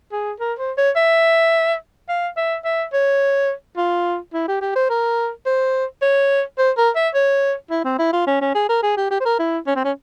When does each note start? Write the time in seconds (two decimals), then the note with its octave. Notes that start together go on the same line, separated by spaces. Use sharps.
0.12 G#4
0.40 A#4
0.59 C5
0.78 C#5
0.96 E5
2.09 F5
2.37 E5
2.65 E5
2.93 C#5
3.77 F4
4.34 E4
4.48 G4
4.61 G4
4.76 C5
4.90 A#4
5.46 C5
6.02 C#5
6.58 C5
6.77 A#4
6.96 E5
7.14 C#5
7.70 E4
7.85 C4
7.99 E4
8.13 F4
8.27 C#4
8.41 C#4
8.55 G#4
8.69 A#4
8.83 G#4
8.97 G4
9.11 G4
9.20 C5
9.25 A#4
9.39 E4
9.67 C#4
9.76 C4
9.84 C#4